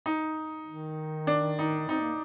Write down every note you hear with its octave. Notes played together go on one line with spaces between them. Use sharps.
D#4
D#3
D4
D#4
C4 D#4
A#3